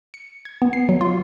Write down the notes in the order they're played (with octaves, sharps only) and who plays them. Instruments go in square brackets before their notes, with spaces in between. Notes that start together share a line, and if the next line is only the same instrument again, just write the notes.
[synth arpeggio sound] C#7
G#6
B3
C7
F#3
F4